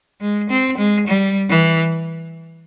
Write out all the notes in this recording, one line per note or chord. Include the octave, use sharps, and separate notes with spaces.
G#3
C4
G#3
G3
E3